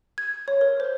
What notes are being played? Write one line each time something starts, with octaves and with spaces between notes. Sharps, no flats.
G#6
C#5
A#4
C5